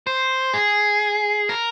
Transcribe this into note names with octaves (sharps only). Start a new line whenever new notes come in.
C5
G#4
A#4